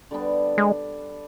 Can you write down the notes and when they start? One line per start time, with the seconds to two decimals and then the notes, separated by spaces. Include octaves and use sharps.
0.11 D3 G3 B3 D4
0.58 G#3